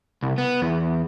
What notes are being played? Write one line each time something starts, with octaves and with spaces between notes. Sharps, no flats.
C2
B3
E2